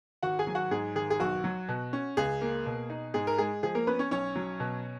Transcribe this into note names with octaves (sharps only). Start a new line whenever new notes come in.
G#1 F#4 F#5
G#4 G#5
F#3
F#4 F#5
G#2 G#4
G#1 G#4
G#4
B1 F#4
F#3
B2
C#4
C#2 G#4
A#3
B2
D#4
G#2 G#4
A#4
G#3 G#4
F3 G#4
A#3 A#4
B3 C#4 B4
C#4 C#5
B1 C#4 C#5
F#3
B2